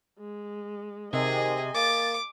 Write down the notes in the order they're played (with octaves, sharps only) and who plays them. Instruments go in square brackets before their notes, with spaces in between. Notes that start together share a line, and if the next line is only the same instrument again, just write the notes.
[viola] G#3
[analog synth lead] C3 [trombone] D#3 [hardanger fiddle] G#4 [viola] D#5 G#5
[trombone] A#3 [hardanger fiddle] D6 [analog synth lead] A6